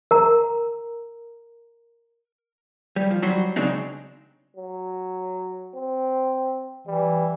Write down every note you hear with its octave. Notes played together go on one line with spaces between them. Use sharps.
A#4 A#5
G3
F3
F#3 G3 F#4 C5
C#3 F#3 G#3 C4 D4 D#4
F#3
C4
E3 G3